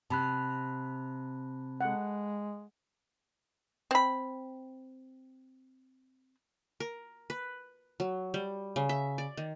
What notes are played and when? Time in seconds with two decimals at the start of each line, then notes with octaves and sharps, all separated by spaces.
0.10 C3 A5 B5 F#6
1.81 G#3 A4 F#5
3.91 C4 B5
6.80 A#4
7.30 B4
8.00 F#3
8.34 G3
8.76 C#3
8.89 E5
9.18 D5
9.37 D#3